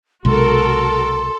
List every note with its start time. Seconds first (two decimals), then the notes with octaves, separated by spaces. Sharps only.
0.25 B1 C3 G#3 F#4 A4 A#4 C6